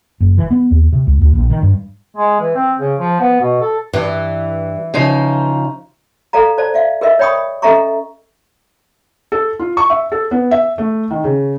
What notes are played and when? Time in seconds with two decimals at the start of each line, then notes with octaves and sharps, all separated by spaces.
0.20 F#1
0.38 E3
0.51 B3
0.71 D#2
0.92 C3
1.07 C#2
1.21 D2
1.35 A#1
1.50 D#3
1.62 G2
2.17 G#3
2.40 E3
2.55 C4
2.79 C#3
2.99 F3
3.20 B3
3.40 B2
3.61 A4
3.94 G2 E3
4.94 C#3 F3 D#4
6.33 A4 D5 F5 A#5
6.58 C5 D5 A5
6.74 D5 E5 F5
7.01 G#4 A#4 B4 D#5 E5
7.19 C#5 D5 G5 B5 C#6 D#6
7.62 C#4 A4 D#5 E5 A#5 C#6
9.32 A4
9.60 F4
9.77 C#6
9.90 E5
10.12 A4
10.31 B3
10.51 E5
10.78 A3
11.11 D#3
11.24 C#3